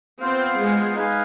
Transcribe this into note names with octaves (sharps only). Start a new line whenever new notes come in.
B3 C4 F4 C5 F5
G#3
D#4 B4 F5 G#5